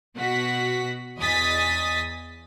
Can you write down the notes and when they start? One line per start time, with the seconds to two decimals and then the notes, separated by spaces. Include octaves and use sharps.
0.15 B2 F#4 F#5 B6
1.19 E2 D#5 G#5 D#6 A6 B6